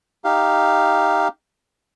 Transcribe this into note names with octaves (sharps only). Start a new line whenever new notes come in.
D#4 G4 F5